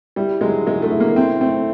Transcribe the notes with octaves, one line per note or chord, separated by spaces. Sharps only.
G3 E4
F#3 G#3
G#3 E4
A3
E4
A#3
C4 E4
A3 C4